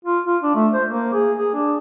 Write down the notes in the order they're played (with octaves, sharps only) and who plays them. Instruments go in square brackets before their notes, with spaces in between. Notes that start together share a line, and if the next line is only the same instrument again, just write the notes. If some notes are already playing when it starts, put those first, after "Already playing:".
[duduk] F4
F4
D4
A3
C5
A#3
G#4
G#4
D4